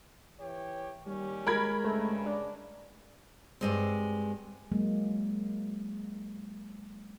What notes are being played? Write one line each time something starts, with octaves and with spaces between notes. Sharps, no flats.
E3 G4 C#5
D#2 G3 C#4 G4
G#3 A#4 B5 G#6
G2 C#3 A3
D4
G2 G#3 C4
F#3 G#3 A#3